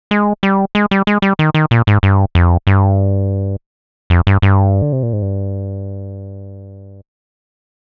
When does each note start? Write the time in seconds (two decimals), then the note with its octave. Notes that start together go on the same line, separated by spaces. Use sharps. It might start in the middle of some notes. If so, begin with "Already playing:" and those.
0.11 G#3
0.43 G3
0.75 G#3
0.91 G3
1.07 G#3
1.22 G3
1.39 D#3
1.54 D#3
1.71 A#2
1.87 G#2
2.03 G2
2.35 F2
2.67 G2
4.10 F2
4.27 G2
4.42 G2
4.82 D3
4.93 C3
5.03 A#2
5.13 G#2
5.22 G2